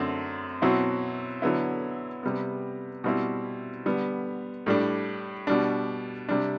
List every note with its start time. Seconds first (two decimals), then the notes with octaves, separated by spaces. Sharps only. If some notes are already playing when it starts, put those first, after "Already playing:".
Already playing: F#2 D3 A3 C4
0.62 B2 F#3 C4 E4
1.42 D3 F#3 B3 E4
2.23 C3 G3 B3
3.04 B2 G3 C4 E4
3.86 D3 G3 B3
4.66 A2 G3 D4
5.47 B2 G3 D4
6.29 C3 G3 D4